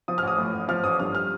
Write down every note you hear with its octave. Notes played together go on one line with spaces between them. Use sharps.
F3 D#6
F6
A1 D#6
A2
A1
F3 F6
A1 D#6
G2 F6
F6